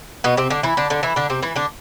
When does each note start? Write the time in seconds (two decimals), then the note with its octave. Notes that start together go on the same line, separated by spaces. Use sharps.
0.24 B2 B3
0.37 C3 C4
0.50 D3 D4
0.63 E3 E4
0.77 D3 D4
0.90 D3 D4
1.03 E3 E4
1.16 D3 D4
1.30 C3 C4
1.43 E3 E4
1.56 D3 D4